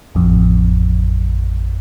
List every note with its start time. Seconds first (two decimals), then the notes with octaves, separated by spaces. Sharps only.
0.15 A1 F2